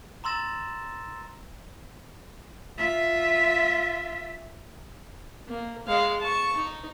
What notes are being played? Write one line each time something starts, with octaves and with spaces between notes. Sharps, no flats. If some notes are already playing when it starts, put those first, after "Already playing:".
A#5 C6 E6 A6 A#6 E7
F4 E5
A#3
G#3 F5
A5 C#6
D#4